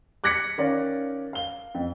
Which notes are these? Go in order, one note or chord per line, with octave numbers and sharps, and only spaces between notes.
D6 F#6 G#6 A#6 B6 C#7
D#3 C#4 D5 F5
F5 G7
F2